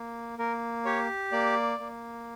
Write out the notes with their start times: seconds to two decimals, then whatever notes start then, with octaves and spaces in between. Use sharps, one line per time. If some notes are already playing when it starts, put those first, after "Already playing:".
Already playing: A#3
0.39 A#3 A#4
0.85 G4 C#5
1.32 A#3 D5
1.79 A#3